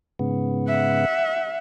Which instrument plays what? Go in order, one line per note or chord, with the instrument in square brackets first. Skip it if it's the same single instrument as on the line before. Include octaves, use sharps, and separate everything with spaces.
[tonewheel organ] G#2 C#3 B3
[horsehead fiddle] E5 F#5